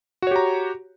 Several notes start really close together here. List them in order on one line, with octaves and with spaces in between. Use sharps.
F#4 C#5 G4 A#5